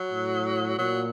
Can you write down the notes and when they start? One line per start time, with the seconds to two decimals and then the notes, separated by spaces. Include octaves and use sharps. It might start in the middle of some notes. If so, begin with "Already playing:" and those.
Already playing: F#3
0.10 A2
0.78 A#2 F#3